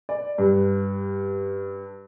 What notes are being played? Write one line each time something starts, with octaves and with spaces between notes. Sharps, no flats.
D5
G2